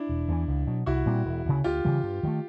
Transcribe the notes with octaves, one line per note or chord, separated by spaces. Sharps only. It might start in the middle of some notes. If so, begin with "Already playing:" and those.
Already playing: D4 E4
E1
E2 C#3 E3
C#2
B2 F#3
C2 E4 F#4
A#2 G3 C4
E1
D2 C#3
D2 F4 G4
C#3 E3 G3
G2
D#3 F#3 A3